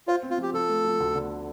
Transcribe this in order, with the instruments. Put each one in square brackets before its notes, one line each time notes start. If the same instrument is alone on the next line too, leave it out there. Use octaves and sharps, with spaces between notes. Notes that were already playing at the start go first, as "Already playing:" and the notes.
[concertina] F4 [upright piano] C5
[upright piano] C4
[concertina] F4
[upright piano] F3 [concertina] G4
[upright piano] F3 [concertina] A4
[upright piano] A3
F3
D2
D3